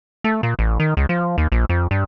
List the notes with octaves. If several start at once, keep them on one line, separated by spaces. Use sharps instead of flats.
A3
A#2
A1
D#3
C#2
F3
D#2
A#1
F2
G2